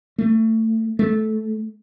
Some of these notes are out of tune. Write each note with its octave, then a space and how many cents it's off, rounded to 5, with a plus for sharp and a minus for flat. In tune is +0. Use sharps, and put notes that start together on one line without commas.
A3 +25
A3 -15